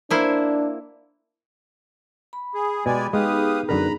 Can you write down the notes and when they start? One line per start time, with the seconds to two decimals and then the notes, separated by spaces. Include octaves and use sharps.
0.10 A#3 D4 E4 C5
2.33 B5
2.55 G#4
2.86 B2 G#3 G4 D5 G#5
3.13 G#3 B3 D#4 G4 G#4 B4 F5 D#6
3.69 F#2 D3 A#4 B4 A#5 B5